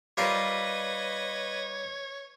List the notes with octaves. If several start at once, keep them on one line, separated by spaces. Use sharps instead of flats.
G3 F4 A#4 B4 C#5 D#5